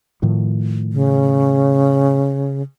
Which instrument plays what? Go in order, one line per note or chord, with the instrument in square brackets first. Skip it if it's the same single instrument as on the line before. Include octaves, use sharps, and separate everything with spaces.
[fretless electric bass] A2 D#3 F3
[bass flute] C#3